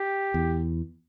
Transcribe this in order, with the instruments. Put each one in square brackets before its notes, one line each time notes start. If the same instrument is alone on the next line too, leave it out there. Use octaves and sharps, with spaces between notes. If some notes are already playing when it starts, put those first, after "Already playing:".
Already playing: [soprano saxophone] G4
[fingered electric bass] E2